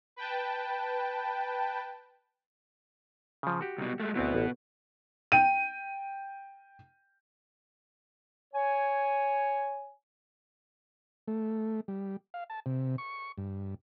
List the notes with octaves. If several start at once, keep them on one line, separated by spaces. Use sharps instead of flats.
B4 G5 A5
C#3 F3
F#4 G4
C2 B2
G#3 A3
D2 B2 B3 C4 E4
A1
G5 D#7
C#5 G#5
A3
G3
F5
A5
C3
C#6
G2